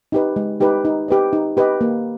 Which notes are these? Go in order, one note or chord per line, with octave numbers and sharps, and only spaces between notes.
D#4 G4 B4
G#3
D#4 G4 B4
D#4
G4 B4 D#5
D#4
G4 B4 D#5
A#3